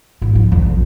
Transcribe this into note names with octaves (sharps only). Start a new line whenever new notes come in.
G#1 A#3
F3
F2
A#1